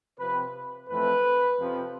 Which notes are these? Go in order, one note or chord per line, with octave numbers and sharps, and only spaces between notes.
C3 F3 C4 B4
F2 E3 A3 C4 B4
F2 C3 F3 C4